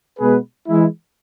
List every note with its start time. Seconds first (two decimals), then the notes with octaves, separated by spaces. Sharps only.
0.19 B2 G#3 B3 G#4 B4
0.67 E3 G#3 E4